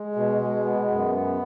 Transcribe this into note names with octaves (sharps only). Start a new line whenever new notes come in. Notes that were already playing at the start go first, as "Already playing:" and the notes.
Already playing: G#3
B2
G#3
B3
F#2
B3